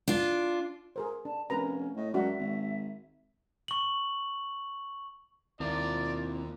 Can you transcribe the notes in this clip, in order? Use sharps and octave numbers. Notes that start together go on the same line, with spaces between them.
D4 F4
G#4 A#4 C5
D4 A5
F1 C#4 A#4 B4 A#5
A2 D#5
F#2 G#3 D4 F#4 E5
G#1
C#6 F#7
D#2 F3 C4 D4 E4 A#4 D5